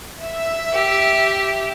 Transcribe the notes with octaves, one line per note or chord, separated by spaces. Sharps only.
E5
G4